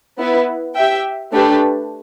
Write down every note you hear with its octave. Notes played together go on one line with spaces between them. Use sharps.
B3 E4 B4
G4 E5 G5
A3 D4 G4 B4